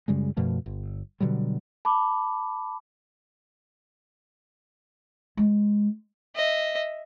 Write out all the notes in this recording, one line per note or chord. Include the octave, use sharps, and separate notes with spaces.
F#2 C#3 G3 G#3
F#2 B2 F3 A3
G1
B2 D3 F#3 G3
A5 B5 D6
G#3
D#5 E5